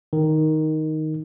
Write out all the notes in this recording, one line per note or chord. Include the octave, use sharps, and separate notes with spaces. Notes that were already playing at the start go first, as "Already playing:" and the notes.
D#3